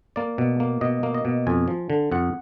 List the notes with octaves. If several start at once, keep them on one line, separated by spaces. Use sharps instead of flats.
A#3 D5
B2
A#3
B2 D#5
A#3
D#5
B2
F2 G#5
F3
D3
F2 F#5